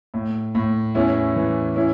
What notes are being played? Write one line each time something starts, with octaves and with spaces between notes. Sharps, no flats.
A2
A2
E2 C#4 E4
E3
C#4 E4